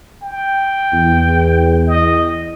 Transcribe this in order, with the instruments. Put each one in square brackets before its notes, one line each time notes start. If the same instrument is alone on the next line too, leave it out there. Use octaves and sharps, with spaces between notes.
[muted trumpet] G5
[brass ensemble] E2
[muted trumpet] D#5